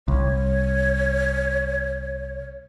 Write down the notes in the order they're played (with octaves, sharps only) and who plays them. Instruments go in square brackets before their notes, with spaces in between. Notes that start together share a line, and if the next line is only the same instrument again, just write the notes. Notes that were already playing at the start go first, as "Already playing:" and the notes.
[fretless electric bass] C2 [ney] C#5